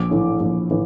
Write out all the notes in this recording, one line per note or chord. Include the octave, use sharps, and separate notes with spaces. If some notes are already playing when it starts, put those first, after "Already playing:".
Already playing: A#1 D6
A2 E3
A#1
A2 E3